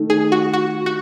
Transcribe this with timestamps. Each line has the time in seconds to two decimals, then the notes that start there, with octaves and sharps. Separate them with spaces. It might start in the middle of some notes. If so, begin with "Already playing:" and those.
Already playing: D#3 A3 D#4
0.10 G#4
0.32 F#4
0.53 F#4
0.86 F#4